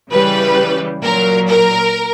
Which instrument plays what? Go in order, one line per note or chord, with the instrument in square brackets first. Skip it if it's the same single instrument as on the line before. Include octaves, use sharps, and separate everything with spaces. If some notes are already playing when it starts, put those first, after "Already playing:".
[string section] C#3 E3 G3 B4
A#2 F#3 A#4
A#4